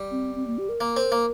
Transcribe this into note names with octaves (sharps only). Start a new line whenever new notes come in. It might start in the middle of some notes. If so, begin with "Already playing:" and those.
Already playing: G3
C4
C4
A#3
G4
A#4
A#3
C4
A#3